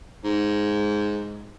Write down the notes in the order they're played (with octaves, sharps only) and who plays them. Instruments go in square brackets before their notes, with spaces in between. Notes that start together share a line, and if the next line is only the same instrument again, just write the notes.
[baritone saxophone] G#2